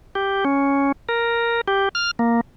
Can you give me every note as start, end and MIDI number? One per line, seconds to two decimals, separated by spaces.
0.15 0.44 67
0.45 0.92 61
1.09 1.61 70
1.68 1.89 67
1.95 2.11 89
2.19 2.41 58